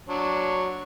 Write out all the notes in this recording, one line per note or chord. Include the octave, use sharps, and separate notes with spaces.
F#3 D4 C#5